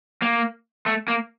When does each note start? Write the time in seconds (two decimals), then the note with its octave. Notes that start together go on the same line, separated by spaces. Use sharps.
0.22 A#3
0.86 A3
1.08 A#3